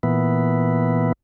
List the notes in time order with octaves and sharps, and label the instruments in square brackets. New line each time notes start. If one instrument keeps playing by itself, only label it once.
[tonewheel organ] A#2 E3 B3